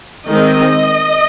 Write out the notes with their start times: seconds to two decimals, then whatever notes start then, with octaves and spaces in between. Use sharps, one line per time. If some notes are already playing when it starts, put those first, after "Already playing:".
0.27 D#3 G#3 C4 D#5